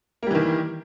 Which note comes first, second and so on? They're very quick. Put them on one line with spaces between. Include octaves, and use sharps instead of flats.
A#3 G3 E3 D#3